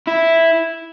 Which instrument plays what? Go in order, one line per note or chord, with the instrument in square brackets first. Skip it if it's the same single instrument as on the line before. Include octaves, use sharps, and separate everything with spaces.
[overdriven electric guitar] E4